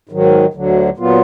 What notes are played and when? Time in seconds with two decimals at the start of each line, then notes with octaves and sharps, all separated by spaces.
0.09 G#2 D#3 F#3
0.53 D2 D3 F#3
0.97 A#2 F#3 B3 F4